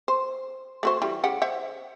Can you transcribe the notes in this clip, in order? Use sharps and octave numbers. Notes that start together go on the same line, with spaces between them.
C5
A3 F#4 C5
E3 G3
C#3 G4 F#5
C5 E5 F#5